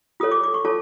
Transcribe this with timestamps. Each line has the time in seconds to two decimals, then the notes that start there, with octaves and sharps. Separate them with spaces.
0.20 F4 A4 C#5 D#6
0.31 D6
0.43 D6
0.54 C#6
0.65 F4 A4 C#5 A5